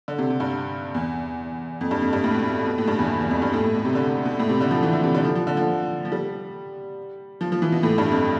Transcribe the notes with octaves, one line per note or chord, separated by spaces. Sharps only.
D3
C3
C3
G2
E2
F2
G2
F2
G2
A2
B2
B2
B2
A2
G2
E2
E2
E2
F2
G2
A2
A2
B2
C3
D3
B2
A2
C3
D3
F3
E3
D3
C3
D3
F3
F3
D3
F3
F3
G3
F3
F3
E3
B2
A2
G2
F2